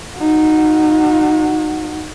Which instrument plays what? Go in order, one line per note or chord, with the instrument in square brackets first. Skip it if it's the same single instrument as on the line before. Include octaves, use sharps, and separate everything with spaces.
[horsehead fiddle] D#4 F#4